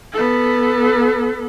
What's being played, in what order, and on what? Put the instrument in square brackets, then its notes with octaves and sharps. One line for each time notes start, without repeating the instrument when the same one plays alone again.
[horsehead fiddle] B3 A4